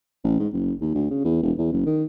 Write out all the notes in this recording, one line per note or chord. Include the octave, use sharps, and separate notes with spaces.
A1
G#2
F#1
D#2
D2
C#3
E2
E1
E2
F#1
D#3